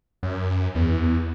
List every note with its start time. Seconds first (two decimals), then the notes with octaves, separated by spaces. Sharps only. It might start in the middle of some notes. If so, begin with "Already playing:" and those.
0.23 F#2
0.75 E2